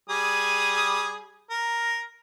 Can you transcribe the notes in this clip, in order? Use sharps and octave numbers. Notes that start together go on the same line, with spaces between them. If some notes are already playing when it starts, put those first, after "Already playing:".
G3 G#4 D#6
A#4